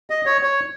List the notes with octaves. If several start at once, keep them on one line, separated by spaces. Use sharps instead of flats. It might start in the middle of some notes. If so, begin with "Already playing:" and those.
D#5
C#5
C#5